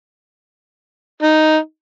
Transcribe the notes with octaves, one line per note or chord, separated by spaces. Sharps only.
D#4